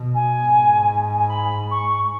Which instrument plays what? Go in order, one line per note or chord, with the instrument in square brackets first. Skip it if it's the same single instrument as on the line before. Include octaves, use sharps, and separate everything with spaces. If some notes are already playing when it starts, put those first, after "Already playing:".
Already playing: [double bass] B2
[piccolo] G#5
[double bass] G#2
[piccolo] G#5
B5
C#6